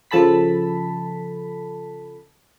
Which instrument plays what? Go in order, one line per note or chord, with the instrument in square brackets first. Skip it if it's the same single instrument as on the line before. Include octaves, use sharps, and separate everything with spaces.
[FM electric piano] C#3 F3 A4 A5 B5 B6